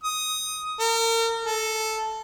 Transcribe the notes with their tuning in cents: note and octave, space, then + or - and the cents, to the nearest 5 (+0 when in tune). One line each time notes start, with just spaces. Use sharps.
D#6 +10
A#4 -35
A4 -5